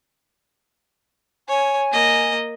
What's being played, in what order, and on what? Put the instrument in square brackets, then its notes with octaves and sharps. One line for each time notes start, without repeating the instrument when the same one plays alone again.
[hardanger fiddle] C#5 [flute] G#5
[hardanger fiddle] A#3 D#5